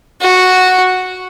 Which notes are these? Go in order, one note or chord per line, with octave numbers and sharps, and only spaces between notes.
F#4